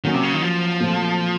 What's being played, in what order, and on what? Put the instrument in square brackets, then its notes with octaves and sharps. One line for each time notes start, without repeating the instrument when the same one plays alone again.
[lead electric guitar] D#3 [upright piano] F#3 A#3 C#4
[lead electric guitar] C3
C#3
D#3
F3
[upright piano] A#2 F#3 A3 C4